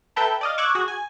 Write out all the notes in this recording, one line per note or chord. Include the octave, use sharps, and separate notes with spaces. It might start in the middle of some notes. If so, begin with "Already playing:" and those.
A4 B4 E5 G5 A5 A#5
D5 D#5 F5
C#6 D6 E6 F#6 G#6
F#4 G#4
G#5